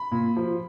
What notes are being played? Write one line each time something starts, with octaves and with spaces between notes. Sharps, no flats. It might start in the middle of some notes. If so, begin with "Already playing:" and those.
Already playing: B5
A#2
F3